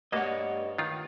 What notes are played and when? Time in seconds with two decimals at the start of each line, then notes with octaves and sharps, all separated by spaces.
0.12 G2 B2 A3 A#3 C#5 D#5 F#5 A5
0.78 D#3 D4 F4